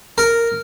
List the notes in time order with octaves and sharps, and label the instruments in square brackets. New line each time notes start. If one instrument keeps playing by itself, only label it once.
[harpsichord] A#4